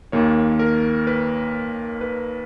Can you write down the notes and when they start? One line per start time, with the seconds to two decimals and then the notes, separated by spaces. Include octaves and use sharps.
0.12 D#2 D#3 A#3 C#5
0.59 A#4
1.07 B4
2.01 B4